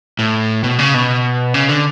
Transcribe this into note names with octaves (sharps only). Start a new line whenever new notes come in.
A2
B2
C#3
B2
C#3
D3